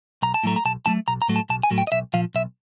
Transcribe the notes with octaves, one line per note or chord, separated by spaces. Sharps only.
B1 A#5
A5
A2 F#3 A3 A#5
A#5
B1 A5
A2 F#3 A3 A5
B1 A#5
A#5
A2 F#3 A3
A5
B1 A5
G#5
A2 F#3 A3
G5
D#5
B1 E5
A#2 F3 F5
B1 E5